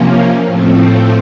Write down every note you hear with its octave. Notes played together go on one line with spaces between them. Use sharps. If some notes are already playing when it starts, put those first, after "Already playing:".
Already playing: C3 F3 A#3 C#4
A2 F3 A3 C4